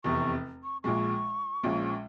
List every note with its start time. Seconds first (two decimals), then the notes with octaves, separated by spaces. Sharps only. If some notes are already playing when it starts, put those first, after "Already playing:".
0.04 F1 E2 C3 C#6
0.64 C#6
0.84 A#1 A#2 G#3 C#6
1.63 A#1 A#2 F3 G#3 C#4